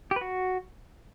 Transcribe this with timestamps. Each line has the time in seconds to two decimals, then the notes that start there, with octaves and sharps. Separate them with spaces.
0.11 G4
0.16 B4
0.21 F#4